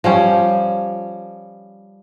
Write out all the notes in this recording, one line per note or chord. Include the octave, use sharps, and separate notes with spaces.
F3 G3 C#4